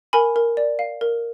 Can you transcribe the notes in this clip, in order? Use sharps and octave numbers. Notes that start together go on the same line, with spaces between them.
A#4 G#5 B5
A#4
D5
F5
A#4